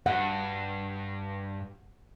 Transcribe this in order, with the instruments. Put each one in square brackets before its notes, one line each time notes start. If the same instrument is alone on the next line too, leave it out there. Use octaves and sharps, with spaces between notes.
[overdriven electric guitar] G2 [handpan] F#5